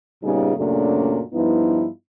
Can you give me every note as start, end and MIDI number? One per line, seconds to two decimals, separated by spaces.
0.23 0.52 46
0.23 0.52 49
0.23 0.52 55
0.23 0.52 59
0.23 0.52 63
0.23 0.52 68
0.57 1.21 42
0.57 1.21 46
0.57 1.21 49
0.57 1.21 54
0.57 1.21 57
0.57 1.21 62
1.33 1.87 43
1.33 1.87 53
1.33 1.87 59
1.33 1.87 63
1.33 1.87 64